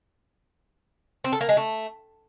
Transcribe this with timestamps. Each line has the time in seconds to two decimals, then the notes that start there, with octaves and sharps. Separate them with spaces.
1.24 C4
1.33 A4
1.41 A#3
1.49 G#3
1.57 A3